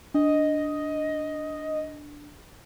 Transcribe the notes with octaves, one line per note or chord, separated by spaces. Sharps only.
D4 D#5